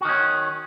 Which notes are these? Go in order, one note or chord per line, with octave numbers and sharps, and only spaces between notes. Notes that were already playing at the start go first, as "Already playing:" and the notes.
D#3 C#4 F#4